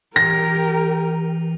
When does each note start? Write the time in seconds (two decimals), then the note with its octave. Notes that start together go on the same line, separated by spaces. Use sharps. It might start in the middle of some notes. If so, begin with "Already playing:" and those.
0.16 E3 G4 A#4 A#6